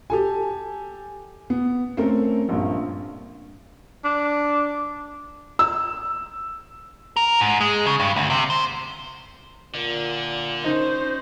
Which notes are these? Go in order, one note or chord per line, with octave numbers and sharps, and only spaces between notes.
G4 A4 G#5
B3
A3 C4 C#4 A#4
A#1 G2
D4
E6
A#4
G#2
G#3
C#3
G2
D2
C3
C5
A#2 D3 D5
C#4 D#4 C5 D#5